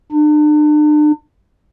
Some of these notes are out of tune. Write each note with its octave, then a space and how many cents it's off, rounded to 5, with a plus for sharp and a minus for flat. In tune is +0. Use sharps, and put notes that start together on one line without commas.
D4 +40